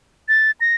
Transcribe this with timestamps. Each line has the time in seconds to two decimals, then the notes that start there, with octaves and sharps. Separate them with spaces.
0.29 A6
0.61 A#6